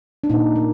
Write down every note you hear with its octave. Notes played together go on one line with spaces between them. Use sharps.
D4
A#2 D#4
A#3